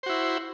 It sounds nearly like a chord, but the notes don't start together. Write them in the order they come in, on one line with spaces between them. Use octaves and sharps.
C5 F#4 E4